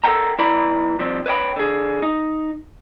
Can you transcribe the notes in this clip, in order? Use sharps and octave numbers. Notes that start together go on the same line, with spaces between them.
A4 A#4 C5 F#5 G5 A#5
B1 E4 B4 D5 A#5 B5
C3 F3 G3 C4
B4 C#5 D#5 G5 B5
D3 G#4
D#4